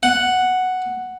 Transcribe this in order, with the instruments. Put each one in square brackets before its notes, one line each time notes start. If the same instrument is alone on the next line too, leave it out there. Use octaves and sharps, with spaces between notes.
[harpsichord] F#5